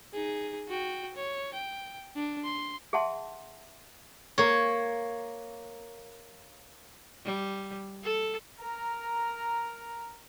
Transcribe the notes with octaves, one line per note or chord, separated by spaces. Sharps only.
D#4 G#4
F#4 G5
C#5
G5
D4
C6
G#4 E5 F#5 A5 C6
A#3 C#5
G3
A4
A#4 A#5